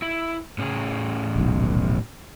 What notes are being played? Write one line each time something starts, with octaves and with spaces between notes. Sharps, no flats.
E4
A2 C#4 G#4
D#1 B1